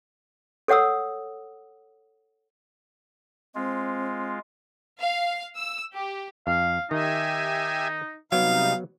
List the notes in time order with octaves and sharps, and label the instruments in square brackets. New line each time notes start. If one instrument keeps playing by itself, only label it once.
[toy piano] A4 C#5 F#5 D#6 E6
[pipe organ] G#3 F4 [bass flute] C4
[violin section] F5
E6
G4
[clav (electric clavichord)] F2 [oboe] F5
[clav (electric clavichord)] D#3 [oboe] D#4 [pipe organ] G4 E5 G#5
[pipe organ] C3 G3 D#4 [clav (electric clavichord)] F#3 B3 [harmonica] F5